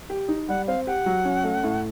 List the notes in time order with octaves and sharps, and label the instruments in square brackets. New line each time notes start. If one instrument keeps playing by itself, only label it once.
[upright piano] G4
D#4
[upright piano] G3 [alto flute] F#5
[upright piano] C4 [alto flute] F5
[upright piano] G4 [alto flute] F#5
[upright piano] F#3
C#4
A3
A2